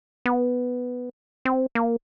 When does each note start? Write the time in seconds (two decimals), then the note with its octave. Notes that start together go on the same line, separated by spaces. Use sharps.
0.26 B3
1.45 C4
1.75 A#3